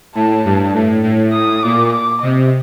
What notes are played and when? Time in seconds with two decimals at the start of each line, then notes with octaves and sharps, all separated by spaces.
0.15 A2 A5
0.45 G2
0.74 A2
1.03 A2
1.33 D#6
1.63 A#2 D6
1.92 D6
2.22 C3 D#5